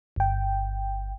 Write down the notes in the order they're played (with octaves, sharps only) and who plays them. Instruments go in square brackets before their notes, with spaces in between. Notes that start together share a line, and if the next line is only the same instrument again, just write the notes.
[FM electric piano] G1 G5